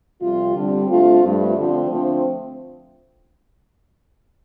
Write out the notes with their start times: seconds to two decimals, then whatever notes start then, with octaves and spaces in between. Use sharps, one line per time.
0.21 F2 C3 G3 F4
0.55 D3 G3 C4
0.88 D3 A3 C4 F4
1.23 G2 F3 A3
1.56 D3 F3 C4
1.90 D3 F3 A3 C4